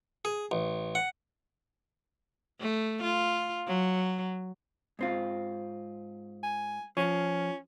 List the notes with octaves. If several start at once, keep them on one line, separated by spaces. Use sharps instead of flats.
G#4
A1
F#5
A3
F4
F#3
G#2 C4 F4
G#5
F3 C#4